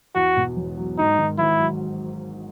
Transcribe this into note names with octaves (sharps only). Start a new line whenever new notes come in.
E2 F#4
B2
E1
F#3
G#2 D#4
D#3
G#1 E4
F#3